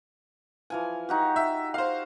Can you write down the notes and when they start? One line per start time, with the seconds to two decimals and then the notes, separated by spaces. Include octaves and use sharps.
0.70 E3 F3 G#5
1.09 D#4 F#4 G4
1.36 E5
1.74 C5 F5